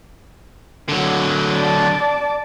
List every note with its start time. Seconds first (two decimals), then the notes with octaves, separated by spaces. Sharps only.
0.89 D3 F#3
1.54 D5 A5